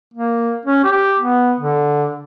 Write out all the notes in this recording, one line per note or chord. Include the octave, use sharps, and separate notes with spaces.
A#3
C#4
G4
B3
D3